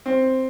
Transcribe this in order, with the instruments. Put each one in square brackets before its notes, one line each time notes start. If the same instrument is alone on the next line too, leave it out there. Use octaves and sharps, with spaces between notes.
[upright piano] C4